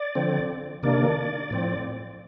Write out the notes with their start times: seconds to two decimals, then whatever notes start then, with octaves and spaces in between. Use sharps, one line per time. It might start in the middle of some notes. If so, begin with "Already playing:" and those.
Already playing: D5
0.15 D3 F3 C4
0.83 C3 D#3 A#3 D4 D5
1.50 A2 F3 C4